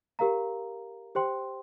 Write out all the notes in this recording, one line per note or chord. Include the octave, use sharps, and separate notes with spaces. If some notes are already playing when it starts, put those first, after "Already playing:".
G4 A#4 F5 A#5
G4 C5 G5 C6